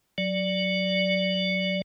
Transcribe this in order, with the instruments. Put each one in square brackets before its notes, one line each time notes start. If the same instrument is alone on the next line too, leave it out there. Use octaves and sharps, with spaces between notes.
[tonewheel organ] F#3 D5